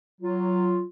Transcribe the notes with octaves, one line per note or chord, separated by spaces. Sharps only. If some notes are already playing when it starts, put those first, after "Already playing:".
F#3 F4